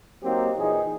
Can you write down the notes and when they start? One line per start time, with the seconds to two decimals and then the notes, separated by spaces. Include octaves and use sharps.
0.24 F#3 A#3 C4 D#4 G4
0.58 A#2 E3 D#4 G#4